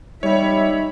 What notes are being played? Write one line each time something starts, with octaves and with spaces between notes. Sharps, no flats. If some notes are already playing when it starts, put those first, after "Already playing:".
G3 D#4 C#5 E5 B5